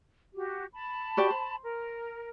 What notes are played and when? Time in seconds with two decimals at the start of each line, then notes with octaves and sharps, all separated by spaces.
0.34 F#4 G4
0.73 A5 B5
1.17 F#4 G4 D5
1.30 C5
1.63 A#4